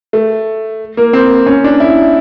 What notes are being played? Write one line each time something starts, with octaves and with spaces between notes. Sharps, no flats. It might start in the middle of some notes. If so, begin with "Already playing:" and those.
A3
A#3
C4
C#4
D4
E4